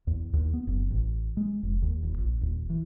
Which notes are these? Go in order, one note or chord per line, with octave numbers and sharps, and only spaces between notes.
E2
D#2
B3
F#1
A1
G#3
F1
D#2
D#1
A#1
D#1
E3